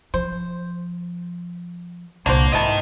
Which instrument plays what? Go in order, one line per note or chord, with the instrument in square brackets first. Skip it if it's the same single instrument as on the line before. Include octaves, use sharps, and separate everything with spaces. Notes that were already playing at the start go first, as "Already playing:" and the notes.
[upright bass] F3 [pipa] C5
[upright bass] C2 A#2 [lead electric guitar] A#3 [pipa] D4 F#4 C5
[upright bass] G#2 [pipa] C3 E3 A5 [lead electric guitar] A#4 D#5